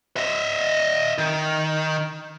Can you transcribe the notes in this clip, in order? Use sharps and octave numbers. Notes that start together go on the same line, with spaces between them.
D#5 E5
D#3